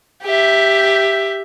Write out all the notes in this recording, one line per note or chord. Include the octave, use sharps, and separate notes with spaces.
G4 E5